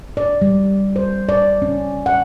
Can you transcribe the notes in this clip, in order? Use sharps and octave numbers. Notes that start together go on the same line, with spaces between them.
D5
G3
C5
D5
C#4
F#5